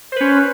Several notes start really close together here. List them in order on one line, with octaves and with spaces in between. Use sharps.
C5 B4 C#4